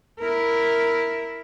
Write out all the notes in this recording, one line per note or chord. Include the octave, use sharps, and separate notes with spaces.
E4 A#4